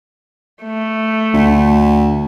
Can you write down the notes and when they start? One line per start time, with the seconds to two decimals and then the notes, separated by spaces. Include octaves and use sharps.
0.63 A3
1.34 D2